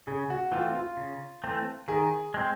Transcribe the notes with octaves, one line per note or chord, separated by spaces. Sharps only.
C#3 G#4
F#4
E3 A3 C4 F4
F4
C#3
E3 A3 C4
D#3 G#4
G#3 C4